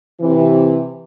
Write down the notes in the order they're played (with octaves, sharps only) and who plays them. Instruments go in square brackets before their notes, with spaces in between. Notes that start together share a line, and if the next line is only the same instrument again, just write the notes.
[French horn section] C3 E3